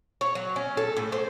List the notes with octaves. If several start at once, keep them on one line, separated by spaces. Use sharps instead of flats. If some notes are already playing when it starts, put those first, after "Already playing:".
C#5
F#3
C#4
A4
A2
C5